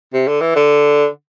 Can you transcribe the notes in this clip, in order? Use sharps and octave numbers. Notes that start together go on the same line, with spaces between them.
C3
D3
E3
D3